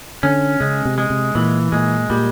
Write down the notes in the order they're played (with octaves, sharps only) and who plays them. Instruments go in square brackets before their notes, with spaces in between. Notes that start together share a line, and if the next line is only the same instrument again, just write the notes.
[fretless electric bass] D3 [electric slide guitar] C#4
[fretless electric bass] C#3 [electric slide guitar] G#3
[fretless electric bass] C3
[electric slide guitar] G#3
[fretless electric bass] C3
[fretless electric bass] A#2 [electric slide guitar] E3
[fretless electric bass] A#2 [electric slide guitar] G#3
[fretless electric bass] A#2 [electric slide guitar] G3